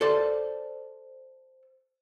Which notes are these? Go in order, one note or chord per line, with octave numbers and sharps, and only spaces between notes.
A4 C5 D5